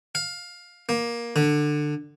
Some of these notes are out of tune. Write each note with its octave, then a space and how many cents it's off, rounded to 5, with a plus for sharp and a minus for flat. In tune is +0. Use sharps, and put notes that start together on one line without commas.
F5 +15
A#3 +15
D3 +20